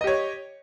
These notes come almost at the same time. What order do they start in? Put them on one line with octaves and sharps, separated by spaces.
D#5 G4 C#5